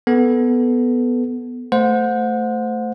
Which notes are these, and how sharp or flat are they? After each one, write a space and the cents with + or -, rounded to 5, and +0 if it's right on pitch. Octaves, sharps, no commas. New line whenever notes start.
B3 +0 A4 -10
A3 +10 C5 -10 F#5 -35